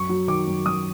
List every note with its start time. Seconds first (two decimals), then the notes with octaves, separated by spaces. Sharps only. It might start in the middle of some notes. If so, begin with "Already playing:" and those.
Already playing: F#2 C#6
0.09 F#3
0.28 D#3 D6
0.47 F#2
0.66 F#2 D#6